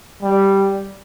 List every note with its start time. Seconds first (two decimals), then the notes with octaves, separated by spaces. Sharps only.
0.22 G3